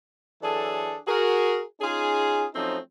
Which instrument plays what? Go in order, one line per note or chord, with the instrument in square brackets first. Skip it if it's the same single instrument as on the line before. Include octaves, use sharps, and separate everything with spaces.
[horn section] E3 F#3 D4 G#4 A4
F#4 G#4 A#4
C#4 D#4 F4 G#4
F3 F#3 A3 C4 C#4 D#4